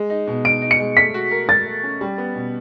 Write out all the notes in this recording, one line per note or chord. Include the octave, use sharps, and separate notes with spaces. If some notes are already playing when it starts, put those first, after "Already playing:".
Already playing: G#3
D#4
B2
D#4 D7
D#4
C#7
G#3
A3 B6
F#4
A#4
A#4 A6
A3
C#4
G3
B3
B2